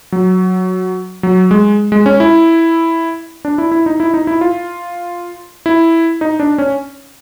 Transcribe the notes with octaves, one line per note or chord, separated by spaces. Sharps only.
F#3
F#3
G#3
G#3
C#4
E4
D4
E4
E4
D#4
E4
D#4
E4
F4
E4
D#4
D4
C#4